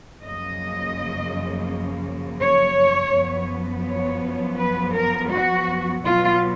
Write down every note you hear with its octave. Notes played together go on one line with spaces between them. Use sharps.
F#2 C#3 F3 A#3 D#5
C#5
F#2 F3 B3
C#5
B4
A#4
F#4
B2 F#3 B3 F4